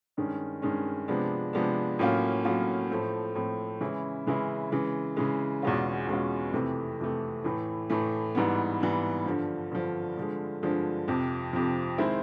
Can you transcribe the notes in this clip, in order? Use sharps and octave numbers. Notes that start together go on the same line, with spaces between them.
G2 D#3 G#3 C#4
G2 D#3 G#3 C#4
C3 F3 G#3 B3 D4
C3 F3 G#3 B3 D4
A2 F#3 A#3 C#4 F4
A2 F#3 A#3 C#4 F4
A2 F3 A3 C4
A2 F3 A3 C4
C#3 E3 G#3 C#4 E4
C#3 E3 G#3 C#4 E4
C#3 E3 G#3
C#3 E3 G#3
E2 B2 G#3 C#4 F4
E2 B2 G#3 C#4 F4
F2 C3 E3 A3
F2 C3 E3 A3
A2 E3 A3
A2 E3 A3
G#2 E3 G3 B3
G#2 E3 G3 B3
G2 D3 F3
G2 D3 F3
G2 D3 F3 G#3
G2 D3 F3 G#3
F2 C3 F3
F2 C3 F3
D#3 G#3 C4 E4